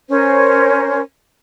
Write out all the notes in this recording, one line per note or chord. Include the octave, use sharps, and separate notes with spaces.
C#4 A#4 C5